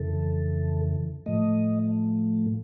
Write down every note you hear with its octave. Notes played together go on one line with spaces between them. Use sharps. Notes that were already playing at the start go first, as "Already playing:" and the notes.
Already playing: F2 C#3 E3 A4
A2 F3 A3 D#5